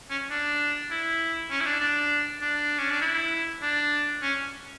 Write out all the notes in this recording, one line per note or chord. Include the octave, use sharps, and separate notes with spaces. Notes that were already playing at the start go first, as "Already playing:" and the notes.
C#4
D4
E4
C#4
E4
D4
D4
D4
C#4
D4
E4
D4
C#4